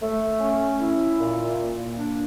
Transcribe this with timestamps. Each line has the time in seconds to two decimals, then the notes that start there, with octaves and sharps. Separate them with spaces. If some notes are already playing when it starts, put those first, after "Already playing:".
0.01 A3
0.41 C#4
0.80 E4
1.19 A#2
1.59 A#3
1.98 D4